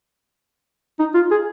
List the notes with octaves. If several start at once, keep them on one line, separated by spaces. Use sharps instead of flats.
D#4
F4
G#4